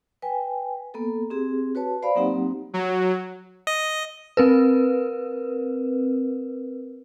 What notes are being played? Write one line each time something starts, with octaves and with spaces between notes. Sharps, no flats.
B4 G5 G#5
A#3 B3 A4
C4 G4 G#4
F#4 B4 C#5 A5
C5 D5 F5 B5
F#3 A#3 C4 D#4 G4 F#5
F#3
D#5
C4 A#4 B4